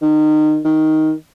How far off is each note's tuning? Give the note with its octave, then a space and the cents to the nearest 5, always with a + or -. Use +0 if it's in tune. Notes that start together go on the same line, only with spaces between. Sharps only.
D#3 -25
D#3 +10